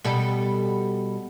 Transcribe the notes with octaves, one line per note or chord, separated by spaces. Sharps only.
B2 G3 A4